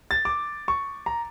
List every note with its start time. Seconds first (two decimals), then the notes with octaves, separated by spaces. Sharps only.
0.11 A6
0.25 D6
0.68 C#6
1.06 A#5